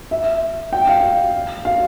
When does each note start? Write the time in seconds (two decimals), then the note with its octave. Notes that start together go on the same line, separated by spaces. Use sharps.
0.11 E5
0.73 G5
0.87 F5
1.65 F5